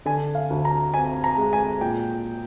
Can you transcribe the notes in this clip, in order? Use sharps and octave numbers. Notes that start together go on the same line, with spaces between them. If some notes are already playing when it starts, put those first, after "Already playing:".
D3 G#5
F5
D2
A#5
C4 G#5
A#5
G#3
G#5
A#2 G5